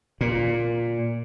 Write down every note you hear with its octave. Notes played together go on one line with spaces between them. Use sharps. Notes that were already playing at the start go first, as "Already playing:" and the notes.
A#2